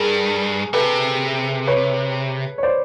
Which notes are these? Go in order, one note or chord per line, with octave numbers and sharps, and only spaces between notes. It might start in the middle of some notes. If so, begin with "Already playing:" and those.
Already playing: G2 G#4 A#4
C3 A4 B4
B4 C#5
C#5
C5 D5